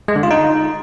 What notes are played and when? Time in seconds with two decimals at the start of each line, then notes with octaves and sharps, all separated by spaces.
0.08 G#3
0.16 D3
0.23 F4
0.31 D#4